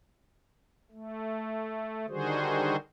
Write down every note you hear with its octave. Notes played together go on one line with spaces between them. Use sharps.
A3
D3 D#3 G3 F#4 G#4 C5